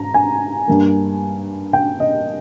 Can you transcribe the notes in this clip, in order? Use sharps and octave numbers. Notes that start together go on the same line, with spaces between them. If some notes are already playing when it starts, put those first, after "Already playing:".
Already playing: G#2 A#5
G#5
G2 G3 A#3
G5
D#5